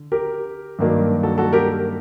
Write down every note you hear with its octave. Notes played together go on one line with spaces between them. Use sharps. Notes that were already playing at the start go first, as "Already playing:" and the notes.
Already playing: D3
G4 A#4
G2 D#3 F#3 A#3 D4
F#4 A4
F#4 A4
G4 A#4